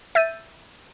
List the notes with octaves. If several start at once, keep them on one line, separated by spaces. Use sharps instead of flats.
E5 E6 G6 A6 D#7